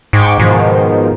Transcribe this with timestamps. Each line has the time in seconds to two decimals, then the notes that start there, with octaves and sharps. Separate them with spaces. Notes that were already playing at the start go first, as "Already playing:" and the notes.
0.13 G#2 G5 C#6 D6
0.40 G#2 B2 D#3 F3